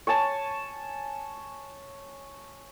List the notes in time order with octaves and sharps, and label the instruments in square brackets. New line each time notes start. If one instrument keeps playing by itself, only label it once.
[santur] C#5 G#5 A5